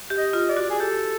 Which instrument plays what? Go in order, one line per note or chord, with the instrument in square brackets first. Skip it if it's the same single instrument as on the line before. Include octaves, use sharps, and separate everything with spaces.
[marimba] G4
[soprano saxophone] D#5
[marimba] F4
[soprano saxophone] D5
[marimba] F#4
[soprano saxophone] G#4
[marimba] G4 [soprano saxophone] A4